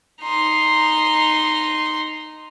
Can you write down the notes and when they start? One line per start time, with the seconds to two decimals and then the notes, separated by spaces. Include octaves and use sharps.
0.22 D#4 C6